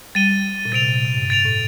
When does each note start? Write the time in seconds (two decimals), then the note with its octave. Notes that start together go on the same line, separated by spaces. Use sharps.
0.15 G3 A6 D#7 G7
0.65 A#2
0.72 C3 A6 D7 F7
0.86 A#2
1.01 A2
1.15 G2
1.30 A2 A6 D7 F7
1.45 A2